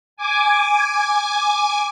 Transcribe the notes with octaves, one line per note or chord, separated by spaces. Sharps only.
G#5 D6